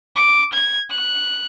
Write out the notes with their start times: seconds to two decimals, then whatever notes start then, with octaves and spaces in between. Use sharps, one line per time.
0.16 D6
0.53 G#6
0.90 F#6